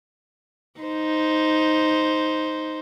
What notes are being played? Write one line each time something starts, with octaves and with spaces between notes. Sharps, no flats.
D#4 C5